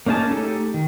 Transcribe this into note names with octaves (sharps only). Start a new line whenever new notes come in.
A#3 C#4 D#4 G#4 A5
A3 D#4 G4 A4
D#3